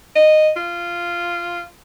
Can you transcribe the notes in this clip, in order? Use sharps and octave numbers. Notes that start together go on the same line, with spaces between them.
D#5
F4